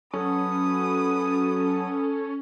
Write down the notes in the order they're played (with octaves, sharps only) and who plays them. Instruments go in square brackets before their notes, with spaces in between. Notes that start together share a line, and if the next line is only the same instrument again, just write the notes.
[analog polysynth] F#3 [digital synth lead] C#4 [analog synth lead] A4 [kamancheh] B4 D#6